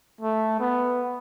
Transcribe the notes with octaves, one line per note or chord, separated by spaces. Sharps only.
A3
B3